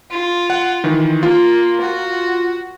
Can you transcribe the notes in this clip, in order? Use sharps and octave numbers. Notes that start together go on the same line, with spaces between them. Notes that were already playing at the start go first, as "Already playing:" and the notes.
F4
F#5
D#3 E3
A#3 F4
F#4